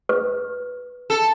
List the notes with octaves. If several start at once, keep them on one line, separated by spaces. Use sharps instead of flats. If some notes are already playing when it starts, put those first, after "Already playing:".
B4
A4